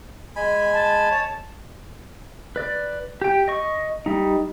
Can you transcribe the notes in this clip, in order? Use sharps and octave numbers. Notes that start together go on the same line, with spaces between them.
G#3 G#5 B5
A5
C#5
B4 D5
G4 G5
D#5 C#6
G3 D#4